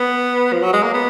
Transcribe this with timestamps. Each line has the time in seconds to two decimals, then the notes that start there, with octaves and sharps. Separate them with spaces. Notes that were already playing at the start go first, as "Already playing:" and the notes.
Already playing: B3
0.53 F3
0.62 F#3
0.73 G#3
0.83 A#3
0.94 B3